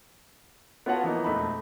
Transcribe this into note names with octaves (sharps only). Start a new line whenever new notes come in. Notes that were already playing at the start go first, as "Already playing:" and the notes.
B3 F4 F#4 C#5 F#5 A5
E3 F3 A#3 B3 D#4
E1 F2 A3 D#4 B5